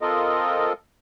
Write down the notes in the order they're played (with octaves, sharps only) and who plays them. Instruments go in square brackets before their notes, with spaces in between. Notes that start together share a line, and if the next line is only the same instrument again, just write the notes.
[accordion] C4 F4 A4 A#4 D#5